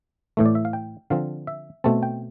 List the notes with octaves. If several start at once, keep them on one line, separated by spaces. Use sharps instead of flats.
A2 E3 A3
D5
E5
F5
G5
D3 F3 C4 F5
E5
B2 A3 C4 A5
G5